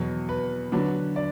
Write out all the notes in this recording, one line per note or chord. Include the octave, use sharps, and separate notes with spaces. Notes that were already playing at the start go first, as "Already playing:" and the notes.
Already playing: E2 B2 F#3
B4
D3 F#3 D4 B4
D5